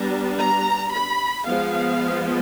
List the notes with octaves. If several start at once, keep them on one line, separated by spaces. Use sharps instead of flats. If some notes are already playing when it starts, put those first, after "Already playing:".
Already playing: G3 B3 D4 A#5
A#5
B5
F3 G#3 B3 F5